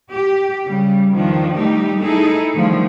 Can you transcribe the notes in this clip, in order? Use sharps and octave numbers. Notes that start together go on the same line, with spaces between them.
G4
C#3 G3
E2 D#3 F3 D4
G3 A3 D#4 G4
D#4 E4 G#4 A4
D3 D#3 F3 G3 A3